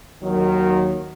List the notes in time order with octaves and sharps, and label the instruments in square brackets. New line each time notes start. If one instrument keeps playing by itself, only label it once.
[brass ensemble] D#2 D#3 F#3